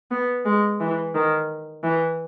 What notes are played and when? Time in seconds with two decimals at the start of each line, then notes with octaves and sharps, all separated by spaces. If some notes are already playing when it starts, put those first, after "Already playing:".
0.11 B3
0.45 G#3
0.80 E3
1.14 D#3
1.84 E3